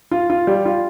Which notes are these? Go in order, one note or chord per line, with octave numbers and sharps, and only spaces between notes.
F4
F4
G3
F4